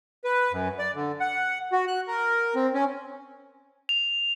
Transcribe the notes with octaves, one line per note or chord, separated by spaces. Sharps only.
B4
F#2
D5
D3
F#5
F#4
F#6
A#4
C4
C#4
F7